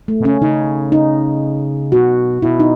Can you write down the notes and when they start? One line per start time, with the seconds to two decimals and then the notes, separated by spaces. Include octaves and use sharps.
0.08 A3
0.20 B2
0.25 C#3 C#4
0.42 C#3 D#4
0.92 D#4
1.92 B2 F#4
2.42 B2 E4
2.60 D#4